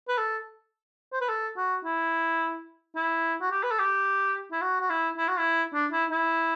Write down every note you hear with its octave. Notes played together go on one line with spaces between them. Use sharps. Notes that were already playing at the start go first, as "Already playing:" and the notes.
B4
A4
C5
B4
A4
F#4
E4
E4
F#4
G4
B4
A4
G4
E4
F#4
F#4
E4
E4
F#4
E4
D4
E4
E4